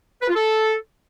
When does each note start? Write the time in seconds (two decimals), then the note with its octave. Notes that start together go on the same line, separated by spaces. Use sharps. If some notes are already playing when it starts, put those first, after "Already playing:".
0.22 B4
0.29 F4
0.36 A4